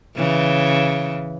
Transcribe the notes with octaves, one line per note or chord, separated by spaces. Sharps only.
C#3 E3